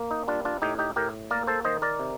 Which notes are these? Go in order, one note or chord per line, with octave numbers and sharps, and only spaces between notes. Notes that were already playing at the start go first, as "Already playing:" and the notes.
Already playing: A#3
D#4
G3 D4 F4
D4 F4
A2 D#4 G4
D#4 G4
A2 G4 A#4
A#3 A#4 D5
A4 C5
D#3 C5 D#5
A#4 D5
C3